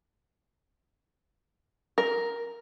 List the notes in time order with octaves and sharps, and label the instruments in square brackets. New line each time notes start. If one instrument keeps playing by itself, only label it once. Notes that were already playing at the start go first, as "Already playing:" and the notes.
[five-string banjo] A#4